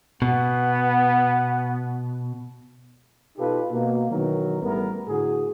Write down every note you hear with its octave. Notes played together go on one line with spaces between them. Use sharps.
B2 B3
B2 D#4 F4 G4 A4 B4
B2 A#3
B2 D#3 E3 F#3 A#4
A1 G3 A3 B3 A#4
A2 D3 F#4 G#4